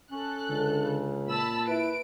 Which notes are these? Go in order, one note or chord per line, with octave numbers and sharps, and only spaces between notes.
C#4 A4 F#6
C#2 D3
C#3
A#2 A5 B5 E6
E4 B4 D7